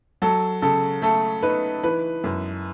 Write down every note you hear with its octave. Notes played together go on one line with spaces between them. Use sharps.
F#3 A4
C#3 A4
A3 A4
D#4 B4
E3 B4
F#2